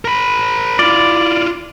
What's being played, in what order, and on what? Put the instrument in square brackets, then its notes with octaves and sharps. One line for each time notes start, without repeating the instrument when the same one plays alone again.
[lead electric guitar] A#4 B5
[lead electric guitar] E4 F4 [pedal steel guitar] D5